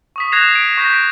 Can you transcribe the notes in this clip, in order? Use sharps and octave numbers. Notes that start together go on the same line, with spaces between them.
C#6 D#6 B6
F#6 G#6 A#6 C7 E7 F7
D7
C#6 G6 A#6 B6
D7